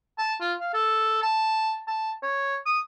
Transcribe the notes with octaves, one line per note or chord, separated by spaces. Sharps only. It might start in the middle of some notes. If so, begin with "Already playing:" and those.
A5
F4
F5
A4
A5
A5
C#5
D#6